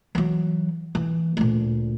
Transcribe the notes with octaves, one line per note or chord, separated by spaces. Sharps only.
E3 F#3
E3
D2 A#2